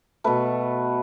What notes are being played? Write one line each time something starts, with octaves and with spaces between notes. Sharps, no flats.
B2 A3 B4